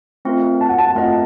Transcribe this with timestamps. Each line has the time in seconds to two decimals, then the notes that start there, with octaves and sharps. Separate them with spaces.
0.25 A3 C4 F4 A#4 D#5
0.61 A5
0.69 F#5
0.78 A5
0.95 A3 C4 F4 A#4 D#5 F#5